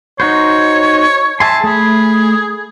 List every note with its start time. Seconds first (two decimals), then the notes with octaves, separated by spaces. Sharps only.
0.20 D#4 F#4 C5 C#5
1.40 E5 G#5 A5 C6
1.64 A3 G#4 B5